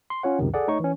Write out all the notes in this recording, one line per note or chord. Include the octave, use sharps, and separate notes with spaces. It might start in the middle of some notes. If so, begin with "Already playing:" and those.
C6
C#4 F4 C#5 F#5
C#2 F#2 C3 D#3
G#4 A4 D5 F#5
A3 D#4 C#5 C#6
E3 C#4